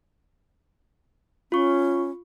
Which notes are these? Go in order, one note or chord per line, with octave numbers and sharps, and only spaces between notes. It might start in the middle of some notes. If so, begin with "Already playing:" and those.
C#4 F4 C#6